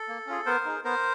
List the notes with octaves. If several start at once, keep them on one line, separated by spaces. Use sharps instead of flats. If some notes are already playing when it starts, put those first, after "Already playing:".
Already playing: A4
A#3
C#4 F4 G#4
B3 A#4 C5
D#4 G#4
B3 A#4 C5